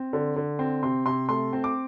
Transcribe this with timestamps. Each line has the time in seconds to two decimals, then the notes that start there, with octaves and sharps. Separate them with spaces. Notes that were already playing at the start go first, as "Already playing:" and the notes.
Already playing: C4
0.13 D3
0.36 D3
0.59 C4
0.83 C3 C6
1.06 C3 C6
1.29 A3 C6
1.53 C4
1.64 D6